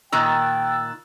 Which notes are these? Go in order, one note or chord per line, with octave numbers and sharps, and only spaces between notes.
A#2 D#3 G5 A#5 E6 F#6 A6